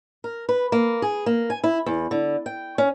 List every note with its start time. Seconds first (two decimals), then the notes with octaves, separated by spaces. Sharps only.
0.24 A#4
0.49 B4
0.72 A#3
1.02 G#4
1.26 A#3
1.50 G#5
1.64 E4
1.86 E2
2.11 D3
2.46 G5
2.78 C#4